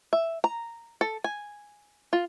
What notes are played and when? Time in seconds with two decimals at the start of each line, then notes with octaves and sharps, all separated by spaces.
0.13 E5
0.44 A#5
1.01 A4
1.24 G#5
2.13 F4